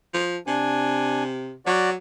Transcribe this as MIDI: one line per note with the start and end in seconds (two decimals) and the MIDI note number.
0.13 0.38 53
0.47 1.55 48
0.47 1.24 62
0.47 1.24 80
1.66 1.94 54
1.66 1.90 66
1.66 1.90 74